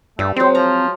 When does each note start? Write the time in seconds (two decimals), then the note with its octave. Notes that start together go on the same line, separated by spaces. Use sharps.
0.19 G2 G3 A3
0.36 F#3 G#3 C4 C5
0.55 F3 A#5